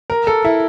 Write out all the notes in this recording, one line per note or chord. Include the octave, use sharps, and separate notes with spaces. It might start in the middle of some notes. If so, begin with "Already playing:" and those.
A#4
A4
E4